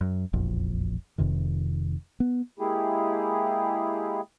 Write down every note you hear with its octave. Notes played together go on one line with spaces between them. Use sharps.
F#2
E1 A#1 F2
F1 F2 C3 D#3
B3
G#3 A#3 E4 G4 G#4